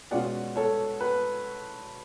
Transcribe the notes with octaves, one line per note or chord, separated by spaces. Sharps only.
B2 G#3 C#4 F4 D5 F#5
A4 C#5
B4